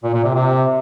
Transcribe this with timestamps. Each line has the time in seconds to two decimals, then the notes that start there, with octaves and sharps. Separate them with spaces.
0.04 A#2
0.14 A#2
0.24 C3
0.34 C3